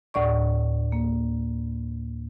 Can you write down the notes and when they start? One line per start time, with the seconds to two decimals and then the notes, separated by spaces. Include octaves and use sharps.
0.14 D2 A2 D5 C#6
0.92 A#3